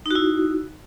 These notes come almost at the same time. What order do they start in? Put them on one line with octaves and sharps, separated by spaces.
D#4 F#4 E4